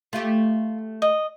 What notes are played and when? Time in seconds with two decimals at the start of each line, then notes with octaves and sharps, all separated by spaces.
0.13 A3 F4 G4
1.02 D#5